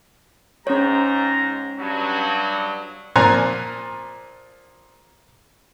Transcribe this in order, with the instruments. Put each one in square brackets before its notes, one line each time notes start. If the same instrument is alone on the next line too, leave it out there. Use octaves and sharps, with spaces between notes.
[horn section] G#2 A#5 [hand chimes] C#4 C#5
[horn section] G2 F#3
[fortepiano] A#2 F3 G#5 A#5 F#6